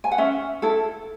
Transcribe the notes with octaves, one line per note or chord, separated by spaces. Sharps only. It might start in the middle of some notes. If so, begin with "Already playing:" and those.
G#5
F#5
C#4 E5
E4 A4